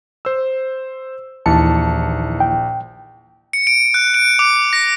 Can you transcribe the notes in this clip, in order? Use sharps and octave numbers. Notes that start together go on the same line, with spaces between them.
C5 E6
A#1 D#2 E3 A5 C#7
G5
C#7
D7
F#6
D7
D6
A#6